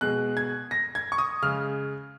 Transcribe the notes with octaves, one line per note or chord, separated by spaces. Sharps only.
B2 G#3 F#6
G#6
A#6
G#6
C#6
D#6
C#3 G#3 F6